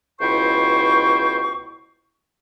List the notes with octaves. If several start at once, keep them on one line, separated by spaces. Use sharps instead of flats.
C#2 B2 E4 C5 G5 C#6